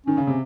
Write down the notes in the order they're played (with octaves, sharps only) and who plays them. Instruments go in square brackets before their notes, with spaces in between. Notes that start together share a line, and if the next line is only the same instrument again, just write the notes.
[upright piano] D#3 [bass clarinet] C#4
[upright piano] C#3
C3